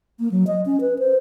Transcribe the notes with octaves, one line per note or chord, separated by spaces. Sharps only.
A#3
F#3
D#5
C#4
B4
C5